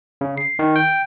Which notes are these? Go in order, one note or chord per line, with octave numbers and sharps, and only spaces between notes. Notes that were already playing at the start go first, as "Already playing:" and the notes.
C#3
C7
D#3
G5